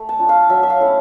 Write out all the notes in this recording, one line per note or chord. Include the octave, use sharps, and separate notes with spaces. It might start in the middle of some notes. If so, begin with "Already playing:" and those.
Already playing: A3
A5
D4 F4
F5
F#3 E5
E5
F5
A3 C#4 E4